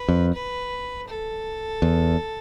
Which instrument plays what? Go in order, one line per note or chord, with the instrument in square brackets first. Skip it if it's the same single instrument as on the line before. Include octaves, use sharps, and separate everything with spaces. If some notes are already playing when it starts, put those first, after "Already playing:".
Already playing: [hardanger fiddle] B4
[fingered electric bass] F2
[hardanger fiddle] B4
A4
[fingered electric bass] E2